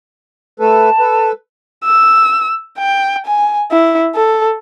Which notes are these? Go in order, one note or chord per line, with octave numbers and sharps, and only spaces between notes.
A3 A4 B4 A5
A4 B4
E6
G5
G#5
E4
A4